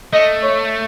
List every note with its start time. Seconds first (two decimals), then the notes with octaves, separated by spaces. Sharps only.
0.13 A3 D#5
0.42 C#5